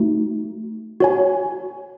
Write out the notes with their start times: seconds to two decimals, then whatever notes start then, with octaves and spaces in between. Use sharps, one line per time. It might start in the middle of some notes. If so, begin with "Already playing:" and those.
Already playing: A3 D#4 F#4
1.00 F#4 C#5 G#5